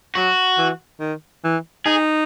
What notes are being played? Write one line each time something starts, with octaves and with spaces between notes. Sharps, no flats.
F#3 F#4
E3
D#3
E3
D#4 G#4